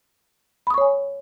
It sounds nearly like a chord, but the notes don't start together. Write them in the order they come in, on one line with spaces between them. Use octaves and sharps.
B5 D#6 C#6 C#5 G#5